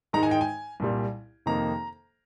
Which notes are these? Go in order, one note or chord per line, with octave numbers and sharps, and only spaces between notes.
G#2 D#3 G#3 D#4 A#5
G#5
G5
G#5
C2 A#2 G3
F2 C3 D#3 A#3 D#4 A#5